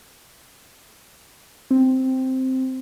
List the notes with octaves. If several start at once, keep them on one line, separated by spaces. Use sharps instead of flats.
C4